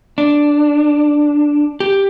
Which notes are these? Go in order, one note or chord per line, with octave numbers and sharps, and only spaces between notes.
D4
G4